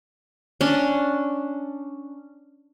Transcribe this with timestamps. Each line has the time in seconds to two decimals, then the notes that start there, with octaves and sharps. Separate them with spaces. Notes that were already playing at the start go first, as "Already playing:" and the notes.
0.61 C#4 D4